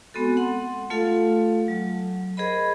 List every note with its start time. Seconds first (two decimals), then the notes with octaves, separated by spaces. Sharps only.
0.14 G#3 B3 C4 F#4 A4
0.37 F#5 C6
0.90 A3 F4 A4 F5
1.68 F#3
2.37 G#4 A#4 C5 D#5 B5